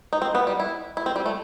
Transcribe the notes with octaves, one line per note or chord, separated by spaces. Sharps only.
D#4
C4
B3
G3
E4
E4
C4
G3
A3